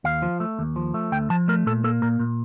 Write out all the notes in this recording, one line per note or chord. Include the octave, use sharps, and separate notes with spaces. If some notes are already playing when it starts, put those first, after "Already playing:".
D#2 F5
F3
A3
D#2
F3
A3
D2 G5
F3 A5
A3 A#4
A#2 A4
A#3 A4
A#2 A#4
A#2